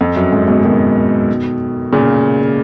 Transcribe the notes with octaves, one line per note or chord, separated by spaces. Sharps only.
F2
F#2
F2 G#2
G#2 B2
B2 D#3
A#2 C#3